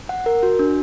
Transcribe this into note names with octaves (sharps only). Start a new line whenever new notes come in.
F#5
A#4
F#4
D4